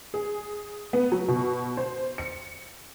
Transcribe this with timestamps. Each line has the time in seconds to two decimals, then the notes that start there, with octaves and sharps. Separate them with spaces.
0.14 G#4
0.93 B3
1.12 F#3
1.28 B2
1.77 C5
2.18 C#7